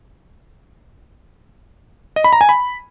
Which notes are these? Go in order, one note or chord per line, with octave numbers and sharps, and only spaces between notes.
D#5
B5
A#5
G#5
B5